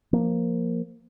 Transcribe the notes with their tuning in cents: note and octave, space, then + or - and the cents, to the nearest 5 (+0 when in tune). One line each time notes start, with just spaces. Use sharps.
F3 +0 A#3 +0